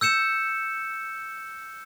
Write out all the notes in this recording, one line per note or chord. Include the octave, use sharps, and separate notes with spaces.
E6 G6 C#7 E7